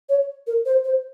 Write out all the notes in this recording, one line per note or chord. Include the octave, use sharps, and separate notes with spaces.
C#5
A#4
C5
C5